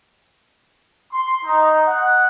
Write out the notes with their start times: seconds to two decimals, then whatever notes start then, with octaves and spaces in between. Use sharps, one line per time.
1.12 C6
1.45 D#4
1.87 F#5